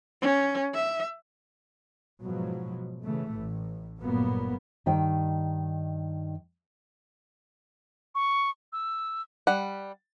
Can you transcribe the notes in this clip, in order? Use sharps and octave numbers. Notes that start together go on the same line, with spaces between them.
C#4
E5
G#2 B2 F3 F#3
C#3 E3 A3
A1 A2
G1 A#2 F#3 A#3 B3
G2 D#3 D#4 G5
C#6
E6
G3 F#5